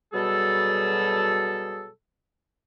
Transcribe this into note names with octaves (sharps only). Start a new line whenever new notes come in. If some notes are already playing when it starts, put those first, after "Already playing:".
B2 F#3 G3 G#4 A4